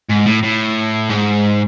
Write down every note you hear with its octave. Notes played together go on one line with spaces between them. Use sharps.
G#2
A2
A2
G#2